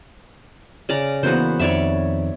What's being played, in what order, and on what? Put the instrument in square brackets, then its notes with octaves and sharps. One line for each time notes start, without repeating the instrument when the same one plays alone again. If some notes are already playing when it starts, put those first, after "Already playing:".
[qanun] C#3 D5 A#5
[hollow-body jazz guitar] C#3 E3 A#3 [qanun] B3 F#4 C5
[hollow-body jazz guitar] F2 D#3 [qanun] C#5 D5 E5